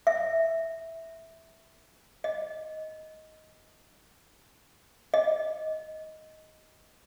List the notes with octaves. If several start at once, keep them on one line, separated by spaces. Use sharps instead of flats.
E5
D#5
D#5